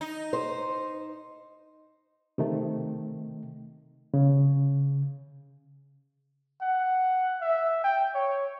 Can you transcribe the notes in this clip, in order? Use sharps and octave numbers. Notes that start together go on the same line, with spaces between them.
D#4
C5
C3 D#3 A3
C#3
F#5
E5
G5
C#5